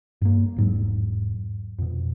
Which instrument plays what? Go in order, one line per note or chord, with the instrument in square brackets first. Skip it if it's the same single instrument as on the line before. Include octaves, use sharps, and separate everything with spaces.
[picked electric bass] G2 A#3
E1 G#2 F#3
F2 B2